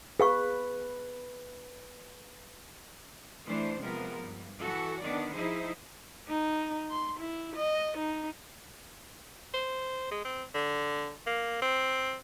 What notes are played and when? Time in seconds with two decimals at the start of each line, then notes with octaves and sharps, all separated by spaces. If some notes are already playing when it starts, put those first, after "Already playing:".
0.20 G#4 B4 F5 C#6
3.45 E3 A3 D4 C5
3.80 C3 F3 G#3 B3 A#4
4.20 G2
4.61 E3 F#4 A4
5.01 D#3 B3 D4 D5
5.32 F3 D#4 E4 G#4 C5
6.28 D#4
6.91 C6
7.20 E4
7.56 D#5
7.98 D#4
9.54 C5
10.11 G#3
10.25 C4
10.55 D3
11.27 A#3
11.62 C4